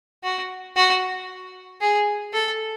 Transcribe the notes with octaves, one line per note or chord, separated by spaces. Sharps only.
F#4
F#4
G#4
A4